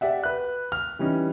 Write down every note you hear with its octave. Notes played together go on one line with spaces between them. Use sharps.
G4 D5 E5 F#5
B4 F#6
F6
E3 G3 C#4 D#4